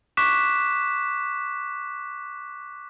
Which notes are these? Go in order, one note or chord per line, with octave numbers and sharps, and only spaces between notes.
C#6 D6 F#6 B6 E7